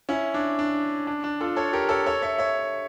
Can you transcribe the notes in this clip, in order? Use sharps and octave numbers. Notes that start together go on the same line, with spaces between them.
C#4 E4
D4
D4
D4
D4
F4 A4
A4 C#5
G4 A#4
A4 C#5
A4 C#5
C#5 E5
C#5 E5